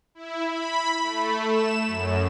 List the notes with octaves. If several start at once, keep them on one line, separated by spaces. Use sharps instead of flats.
E4
B5
A3
E7
F#2